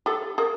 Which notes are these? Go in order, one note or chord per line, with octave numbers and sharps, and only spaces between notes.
G4 A4
G#4 A#4